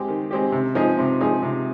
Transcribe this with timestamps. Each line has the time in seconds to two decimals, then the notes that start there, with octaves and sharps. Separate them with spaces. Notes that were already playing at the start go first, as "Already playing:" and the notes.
Already playing: G#3 C4 G4
0.08 D#3
0.31 G#3 C4 G4
0.52 C3
0.75 F3 G#3 D#4 G#4
0.98 C3
1.21 F3 G#3 D#4 G#4
1.43 C3